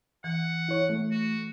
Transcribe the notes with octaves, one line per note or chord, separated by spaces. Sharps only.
E3 F#5
E4 C#5
A3
F#4